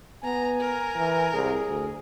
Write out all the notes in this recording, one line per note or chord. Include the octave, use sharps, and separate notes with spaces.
B3 G#5 A#5
A#4
E3
C2 G#4
D2